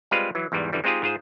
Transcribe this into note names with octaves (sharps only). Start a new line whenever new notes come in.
G3 G#3 C4 F4 B4 F5
E3 F#3
E2 G#2 E3 G3
F#2 D3 E3 G3
G#3 C4 D#4 F4 G4 G#4
G#2 F4 G#4 C5